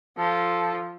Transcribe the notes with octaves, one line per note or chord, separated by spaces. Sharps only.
F3 A4 A5